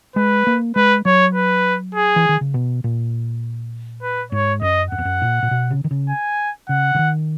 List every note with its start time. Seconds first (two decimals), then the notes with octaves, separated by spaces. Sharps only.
0.16 G#3 B4
0.47 A#3
0.76 G#3 B4
1.05 F#3 C#5
1.35 B4
1.95 G#4
2.16 E3
2.29 D#3
2.41 C#3
2.54 B2
2.84 A#2
4.02 B4
4.32 G#2 C#5
4.62 F#2 D#5
4.91 F#2 F#5
4.98 E2
5.05 F#2
5.22 A#2
5.43 A#2
5.51 B2
5.70 C#3
5.84 D#3
5.91 C#3
6.09 G#5
6.69 C#3 F#5
6.95 C#3
6.99 D#3